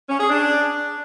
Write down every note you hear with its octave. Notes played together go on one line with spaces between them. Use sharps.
C#4
G#4
D4